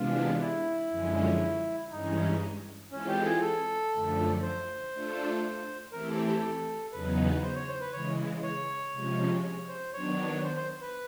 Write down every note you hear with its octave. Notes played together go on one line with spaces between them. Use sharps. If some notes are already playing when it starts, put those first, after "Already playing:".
Already playing: C3 E3 G#3 B3 D4 F4
E4
F#2 D3 F3 G#3 C#4
G2 E3 G#3 C#4 D#4
E3 G#3 C4 C#4 F4 A4
G4
G#4
A4
F#2 D3 F3 A3
C5
A3 D4 F4 A4
E3 A3 C4 E4 G4 A#4
A4
A4
E2 C#3 F#3 B3 D#4 B4
C5
C#5
C5
B4
C#3 E3 G#3 C#5
C#5
C3 F3 G#3 C#4
C#5
C5
D#3 F#3 B3 D4 C#5
C5
C5
B4